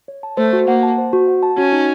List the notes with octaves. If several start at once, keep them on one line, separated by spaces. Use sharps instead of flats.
C#5
A5
A3 C5
F#4
A#3 F#5
A5
C5
F#4
F#5
A5
C#4 F#4
D#4